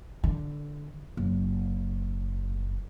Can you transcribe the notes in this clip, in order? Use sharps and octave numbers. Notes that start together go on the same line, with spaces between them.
D3
F#1